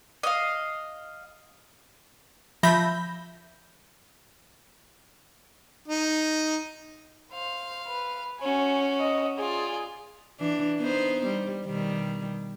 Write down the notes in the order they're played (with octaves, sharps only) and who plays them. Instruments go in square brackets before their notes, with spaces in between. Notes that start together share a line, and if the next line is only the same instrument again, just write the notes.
[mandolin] D#5 F5
[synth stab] F3 E5 B5 G6 A#6
[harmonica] D#4
[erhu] C5 [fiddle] F5
[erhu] B4
[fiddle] C#4 F#4 [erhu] G#5
[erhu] D#5
[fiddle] F4 D5 [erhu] G#4
[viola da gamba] E3 D4
B3 D#4 C5
G3
B2 D#3 G3